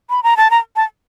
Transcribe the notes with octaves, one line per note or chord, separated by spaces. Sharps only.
B5
A#5
A5
A#5
A5